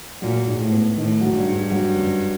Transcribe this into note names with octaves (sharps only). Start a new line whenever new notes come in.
A#2 F#3
G#2
A2
B3
A2 D#3
F#3
G2
G#2
F#3
F#2